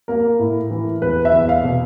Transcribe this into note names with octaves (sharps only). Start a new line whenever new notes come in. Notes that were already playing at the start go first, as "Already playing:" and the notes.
A#3 A#4
A2
E3
E2 B4
E5
E2
F5
B2